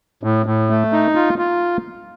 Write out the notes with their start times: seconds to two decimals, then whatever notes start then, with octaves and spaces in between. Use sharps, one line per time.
0.23 A2
0.46 A2
0.70 A3
0.92 D#4
1.15 F4
1.38 F4